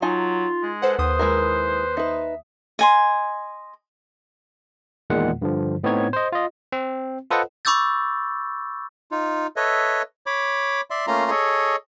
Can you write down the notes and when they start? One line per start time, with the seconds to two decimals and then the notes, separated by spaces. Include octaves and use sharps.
0.02 F#3 D#4 F4 G#5 A5
0.63 G#3
0.82 A4 B4 C5 F#5
0.99 D#2 C5 D#6
1.19 G#3 E4 A#4
1.97 D#4 B4 E5
2.79 D#5 G#5 C6
5.10 E2 A#2 D#3 G#3 F#5
5.42 G2 D3 F3
5.84 A2 B3 C4 D#4 C#5 G#6
6.13 C5 D#5
6.32 F4 D#5
6.72 C4
7.31 F4 A4 B4 C5 D#5 F#5
7.65 B5 C#6 D6 E6 G6 A6
9.11 D#4 F4
9.56 A4 B4 C#5 D#5 E5
10.26 C#5 B5 D6
10.90 D5 E5 C6
11.07 A3 A#3 C#4 F4 A#5 C6
11.30 G#4 A4 C#5 D#5